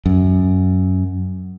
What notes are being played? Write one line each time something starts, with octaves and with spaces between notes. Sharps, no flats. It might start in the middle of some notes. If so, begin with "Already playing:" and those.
F#2